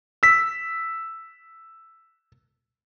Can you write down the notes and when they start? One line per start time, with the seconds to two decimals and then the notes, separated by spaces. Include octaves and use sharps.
0.23 E6 B6